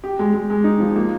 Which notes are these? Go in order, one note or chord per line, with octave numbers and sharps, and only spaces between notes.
G4
G#3
G#3
G#3
D#4
F3
A#3